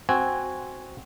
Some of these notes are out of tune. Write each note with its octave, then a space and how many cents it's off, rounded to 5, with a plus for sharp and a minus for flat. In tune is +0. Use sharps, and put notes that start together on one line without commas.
C4 +0 F#4 +0 G#5 +0